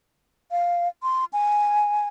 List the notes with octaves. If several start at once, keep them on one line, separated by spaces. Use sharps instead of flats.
F5
C6
G#5